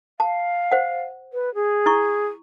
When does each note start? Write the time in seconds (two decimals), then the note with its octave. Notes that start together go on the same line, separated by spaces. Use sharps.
0.20 F5 A5
0.71 C5 F#5
1.33 B4
1.55 G#4
1.86 E4 C#6